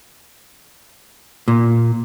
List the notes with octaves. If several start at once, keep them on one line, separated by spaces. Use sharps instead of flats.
A#2